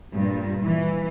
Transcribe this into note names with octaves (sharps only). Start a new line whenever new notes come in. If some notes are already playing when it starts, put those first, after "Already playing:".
G2 A#2
E3